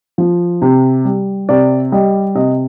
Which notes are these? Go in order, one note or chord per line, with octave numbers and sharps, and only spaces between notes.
F3
C3
G3
C3 D5
G3 D#5
C3 D#5